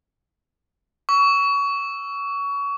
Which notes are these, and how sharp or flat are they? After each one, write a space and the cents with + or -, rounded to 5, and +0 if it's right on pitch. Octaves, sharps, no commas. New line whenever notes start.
C#6 +25 E6 +0